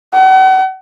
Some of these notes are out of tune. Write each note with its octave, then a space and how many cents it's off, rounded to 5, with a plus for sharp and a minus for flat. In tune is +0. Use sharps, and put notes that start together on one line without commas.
F#5 +40